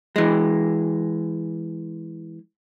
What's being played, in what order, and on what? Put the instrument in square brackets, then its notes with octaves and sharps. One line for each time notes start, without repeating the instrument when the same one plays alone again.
[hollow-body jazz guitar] E3 G#3